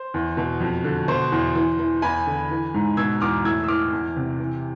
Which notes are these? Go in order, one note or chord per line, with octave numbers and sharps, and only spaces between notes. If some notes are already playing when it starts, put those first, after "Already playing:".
Already playing: C5
E2
B2
F2
D3
B2 C5
E2
E3
E3
E2 G#5 B5
D3
E3
G#2
B2 E6 G#6
E2 D6 F6
A2 E6 G#6
E6
E3 D6 F6
E2
C3
E3